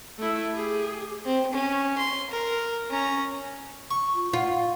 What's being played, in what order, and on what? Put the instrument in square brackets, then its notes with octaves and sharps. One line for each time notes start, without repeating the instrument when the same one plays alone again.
[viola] A3 E4
G4 G#4
[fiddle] C4
C#4
C6
A#4
C#4 A#5
[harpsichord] C#6
[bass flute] F4
[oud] F4 [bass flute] F#5